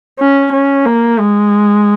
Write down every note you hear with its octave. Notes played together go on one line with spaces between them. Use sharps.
C#4
C#4
A#3
G#3